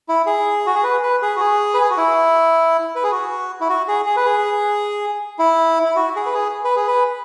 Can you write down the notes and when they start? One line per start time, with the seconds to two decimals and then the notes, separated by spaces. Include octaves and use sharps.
0.09 E4
0.26 G#4
0.66 F#4
0.75 G#4
0.83 B4
1.03 B4
1.22 G#4
1.36 F#4
1.40 G#4
1.74 B4
1.81 G#4
1.90 F#4
1.97 E4
2.95 B4
3.03 G#4
3.12 F#4
3.61 E4
3.69 F#4
3.88 G#4
4.06 G#4
4.17 B4
4.26 G#4
5.39 E4
5.85 E4
5.96 F#4
6.16 G#4
6.26 B4
6.34 G#4
6.64 B4
6.76 G#4
6.87 B4